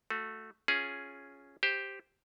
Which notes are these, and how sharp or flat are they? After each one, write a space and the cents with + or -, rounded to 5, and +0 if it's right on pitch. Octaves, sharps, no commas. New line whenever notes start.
A3 +0 F#4 -20
C#4 +0 F4 +0 G#4 +0
G4 +0 C5 +0